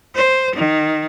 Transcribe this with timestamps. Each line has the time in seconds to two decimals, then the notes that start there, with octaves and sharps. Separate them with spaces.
0.16 C5
0.55 D#3